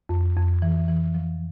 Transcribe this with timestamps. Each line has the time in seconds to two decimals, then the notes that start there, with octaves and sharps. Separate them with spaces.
0.09 F2
0.36 F2
0.62 E3
0.88 E3
1.14 F3